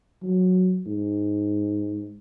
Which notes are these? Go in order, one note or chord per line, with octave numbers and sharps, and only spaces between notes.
F#3
G#2